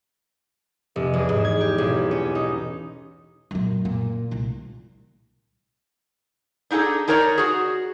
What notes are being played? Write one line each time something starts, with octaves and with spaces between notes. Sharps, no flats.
F1
E2
G#2
G#6
G4
B1
C#4
D#4
F#2 A#2
A#2
C2 A#2
D4 D#4 F4 G#4 A4
D4 D#4 A#4 C#5 D5 A#5
F#4 G#4